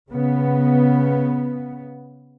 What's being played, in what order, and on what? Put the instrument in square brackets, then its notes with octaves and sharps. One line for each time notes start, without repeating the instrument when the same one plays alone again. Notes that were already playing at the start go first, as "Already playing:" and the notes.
[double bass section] C#3 B3